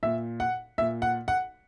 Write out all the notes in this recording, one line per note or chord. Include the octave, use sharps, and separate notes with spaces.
A#2 E5
F#5
A#2 E5
F#5
F#5